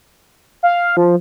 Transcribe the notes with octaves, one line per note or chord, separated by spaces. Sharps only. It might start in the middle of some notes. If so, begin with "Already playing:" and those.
F5
F3